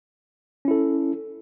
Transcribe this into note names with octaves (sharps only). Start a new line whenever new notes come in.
C#4 E4 A4